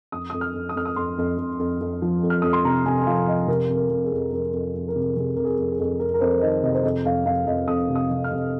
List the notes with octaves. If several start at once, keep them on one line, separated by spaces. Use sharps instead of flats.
F2 D#6
F2 D#6
F6
F2
D#6
F2 F6
D#6
F2 C6
F2
F2
F2
F2
F3
F2
F6
F2 D#6
C6
C3 A#5
C3 G#5
G#5
F3 F5
F2 D#5
C3 A#4
F2
A#4
C3
G#4
F2
F2 A#4
F2
F2
A#4
C3
C3 G#4
C3 A#4
G#4
F2
G#4
F2
F2 A#4
A#4
F2 C5
C5
D#3 D#5
C3 D#5
C5
F2 D#5
F2 F5
F2 F5
F2 D#5
F2 D#6
C3
D#6
C3
F6
C3